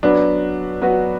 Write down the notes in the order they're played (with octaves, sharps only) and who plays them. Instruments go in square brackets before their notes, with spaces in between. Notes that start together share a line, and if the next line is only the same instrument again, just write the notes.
[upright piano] F#3 B3 F#4 B4 [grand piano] D4
[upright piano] F#3 B3 F#4 B4